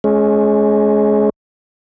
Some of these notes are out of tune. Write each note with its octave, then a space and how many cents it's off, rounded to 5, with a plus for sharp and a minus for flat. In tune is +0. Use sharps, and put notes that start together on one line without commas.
G#3 +25 C#4 +0